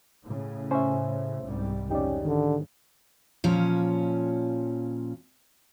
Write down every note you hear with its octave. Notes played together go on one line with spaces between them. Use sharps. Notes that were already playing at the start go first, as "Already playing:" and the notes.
A2 C#3
C#4 C5 E5
C2 G#2 G3
F2 G#2 C#3 C#4 D#4 G4 D5
D3 D#3
A#2 F3 C#4